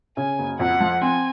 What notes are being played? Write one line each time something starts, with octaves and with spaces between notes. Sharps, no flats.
C#3 G#5
F#1
F2 F#5
F3
C4 G#5